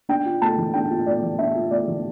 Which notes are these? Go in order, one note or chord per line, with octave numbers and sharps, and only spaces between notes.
D4 G5
F4
A3 A5
E3
D4 G5
F4
A3 D5
E3
D4 E5
F4
A3 D5
E3